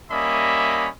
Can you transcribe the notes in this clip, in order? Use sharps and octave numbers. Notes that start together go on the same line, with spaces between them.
G3 A#3 C#4 D#5 E5 B5